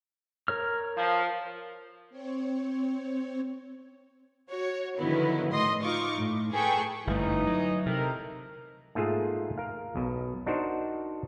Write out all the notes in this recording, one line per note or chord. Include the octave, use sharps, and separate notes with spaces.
A#4 C#5 F6
F3
C4 C#5
F#4 C#5
D3 D#3 F3 F#3 B3 E4
A2 D#5 C6 D#6
D#4 F4 C#6 D6
A2
G#4 A4 B4 G5 C#6
G1 F#2 E3 A3 D#4
F#3
C3 A3 A#4
G#2 A3 A#3 F4 G#4
A#4 F5
B1 B2
D4 D#4 F#4 A#4 C5